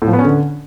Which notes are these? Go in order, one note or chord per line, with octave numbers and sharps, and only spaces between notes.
A2
F3
B3
C#4
D3